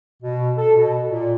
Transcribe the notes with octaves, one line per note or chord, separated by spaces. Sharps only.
B2
A4
B2
A#2